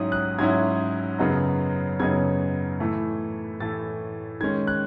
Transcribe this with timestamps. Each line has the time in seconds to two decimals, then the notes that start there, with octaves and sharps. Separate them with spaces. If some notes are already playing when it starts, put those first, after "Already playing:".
Already playing: G#2 F#3 C#4 E4 D#6
0.12 F#6
0.39 G#2 F#3 C#4 E4 G#6
1.19 F#2 C#3 F#3 B3 D#4
2.00 F#2 C#3 F#3 B3 D#4 G#6
2.80 A2 E3 A3
3.60 A2 E3 A3 A6
4.41 D#3 G#3 C#4 G#6
4.67 F#6